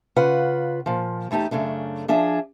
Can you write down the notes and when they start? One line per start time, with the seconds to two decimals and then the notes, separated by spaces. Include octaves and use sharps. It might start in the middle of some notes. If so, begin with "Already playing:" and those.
0.16 C#3 F4 B4 F#5
0.86 A#2 F3
1.31 E2 A3 D#4 G4 A5
1.51 F#2 C#3 A3 D4
2.08 F3 D4 G#4 E5